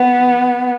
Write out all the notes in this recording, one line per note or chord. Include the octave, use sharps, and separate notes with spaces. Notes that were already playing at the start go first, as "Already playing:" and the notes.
Already playing: B3